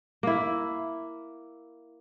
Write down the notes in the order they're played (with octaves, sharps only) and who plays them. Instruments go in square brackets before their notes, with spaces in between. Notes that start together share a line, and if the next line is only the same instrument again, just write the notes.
[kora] A#3 E4